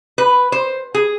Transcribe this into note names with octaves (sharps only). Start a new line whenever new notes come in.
B4
C5
G#4